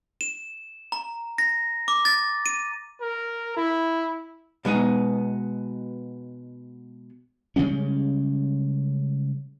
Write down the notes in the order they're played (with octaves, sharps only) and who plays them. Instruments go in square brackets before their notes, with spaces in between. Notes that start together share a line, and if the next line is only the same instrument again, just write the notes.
[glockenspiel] E7
A#5
A#6
D6
A6
D#7
[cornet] A#4
E4
[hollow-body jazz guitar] B2 G#3 B3 D#4
[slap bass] C#3 G3 G#3 C#4